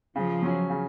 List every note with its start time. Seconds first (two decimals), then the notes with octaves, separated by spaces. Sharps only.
0.15 C#3 F3
0.43 F#3 C#4
0.70 C#3